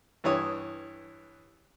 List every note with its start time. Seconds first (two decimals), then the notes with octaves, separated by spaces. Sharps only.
0.24 G2 E3 C#5 D#6